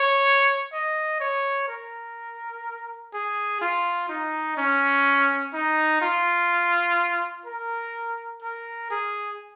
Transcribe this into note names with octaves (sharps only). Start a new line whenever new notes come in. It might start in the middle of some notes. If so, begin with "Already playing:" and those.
Already playing: C#5
D#5
C#5
A#4
G#4
F4
D#4
C#4
D#4
F4
A#4
A#4
G#4